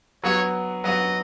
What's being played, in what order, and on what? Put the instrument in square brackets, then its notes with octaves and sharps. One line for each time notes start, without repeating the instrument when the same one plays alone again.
[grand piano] F#3 B3 F#4 [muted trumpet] C#5
[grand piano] F#3 B3 F#4 [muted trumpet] D#5